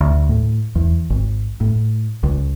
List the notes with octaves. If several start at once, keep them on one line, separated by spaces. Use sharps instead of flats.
D2
A2
E2
G#1
A2
C#2